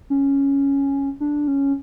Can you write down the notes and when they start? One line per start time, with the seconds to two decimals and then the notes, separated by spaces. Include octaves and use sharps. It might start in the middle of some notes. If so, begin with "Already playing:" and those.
0.10 C#4
1.20 D4
1.48 C#4